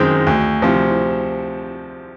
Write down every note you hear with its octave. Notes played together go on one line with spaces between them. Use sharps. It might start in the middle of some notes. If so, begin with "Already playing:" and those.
Already playing: F#2 D#3 G#3 C4
D2
C3 F3